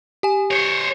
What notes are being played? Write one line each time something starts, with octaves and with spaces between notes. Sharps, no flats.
G4 G#5
C5 C#5